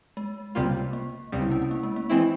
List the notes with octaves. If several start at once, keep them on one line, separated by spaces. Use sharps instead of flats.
G#3
C#2 C3 G3 A#3 F4
A#3
C#2 C3 G3 C4
E4
C#4
C#4
A#3
G#3
A#3
E3 G#3 C4 E4